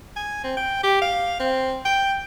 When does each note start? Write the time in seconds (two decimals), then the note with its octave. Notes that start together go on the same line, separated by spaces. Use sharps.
0.16 G#5
0.44 C4
0.57 G5
0.83 G4
1.01 F5
1.40 C4
1.85 G5